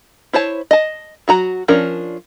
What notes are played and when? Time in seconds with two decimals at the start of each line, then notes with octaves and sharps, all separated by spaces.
0.33 E4 C5 C#5 A5
0.71 D#5 A5
1.28 F#3 F#4 A#5
1.68 F3 C#4 D4 A#4